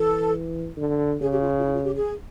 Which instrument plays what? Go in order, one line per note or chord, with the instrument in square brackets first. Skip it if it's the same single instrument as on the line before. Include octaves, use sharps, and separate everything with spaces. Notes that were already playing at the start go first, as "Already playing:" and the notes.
Already playing: [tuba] E3 [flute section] A4
[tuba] D3
[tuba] C#3 [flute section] G#4
[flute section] G4
F4
F4
E4
F4
G4
G#4